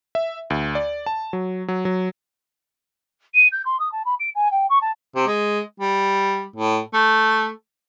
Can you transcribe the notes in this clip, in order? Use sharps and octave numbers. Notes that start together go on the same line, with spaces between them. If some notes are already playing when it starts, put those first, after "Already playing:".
E5
D2
D5
A5
F#3
F#3
F#3
D#7
G6
C6
D#6
A5
B5
D7
G#5
G5
C#6
A5
C3
G#3
G3
A2
A3